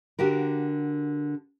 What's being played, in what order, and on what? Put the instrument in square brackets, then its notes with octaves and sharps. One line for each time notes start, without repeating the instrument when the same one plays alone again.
[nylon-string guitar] D3 F#4 G4 A#4